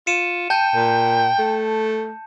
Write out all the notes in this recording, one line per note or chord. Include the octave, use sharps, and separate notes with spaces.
F4 C#7 D#7 E7
G5 A5 G6
A#2
A3